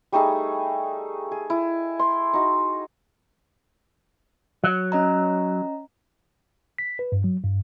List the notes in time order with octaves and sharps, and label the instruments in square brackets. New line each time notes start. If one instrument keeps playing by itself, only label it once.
[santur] G3 A3 D#4 G#4
G#4
E4
C6
D#4 F#4
[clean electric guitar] F#3
[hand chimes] C#4 D#5 A#5
[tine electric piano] B6
B4
G2
F#3
G2